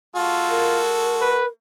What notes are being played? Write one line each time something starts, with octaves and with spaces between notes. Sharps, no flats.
G#3 F4 F#4 A4
A#4
B4